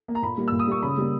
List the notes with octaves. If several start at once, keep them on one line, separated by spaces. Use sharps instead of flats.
A#3
A#5
A#2 B5
G3 A#3
A#2 E6
D#6
G3 A#3 C#6
C#3 B5
G3 A#3